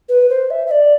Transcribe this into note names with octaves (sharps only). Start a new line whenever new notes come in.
B4
C5
E5
E5
D5